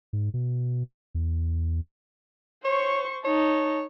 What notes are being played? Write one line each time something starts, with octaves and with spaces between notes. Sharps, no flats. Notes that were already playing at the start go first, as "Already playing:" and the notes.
G#2
B2
E2
C5 C#5 C#6
D#4 C#5 A5